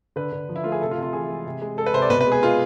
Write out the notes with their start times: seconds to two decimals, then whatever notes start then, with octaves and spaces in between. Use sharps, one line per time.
0.16 D3 B4
0.32 D3
0.49 F3
0.56 E4
0.64 A3 F4
0.72 G#4
0.81 C3 A4
0.91 F4
0.98 C3
1.03 F4
1.13 E3 G#4
1.30 G#3
1.46 C3
1.62 G#3
1.77 G#3 A4
1.86 B4
1.94 C3 C5
2.02 D5
2.10 B2 B4
2.21 B4
2.27 G#3
2.32 G#4
2.43 G#3 F4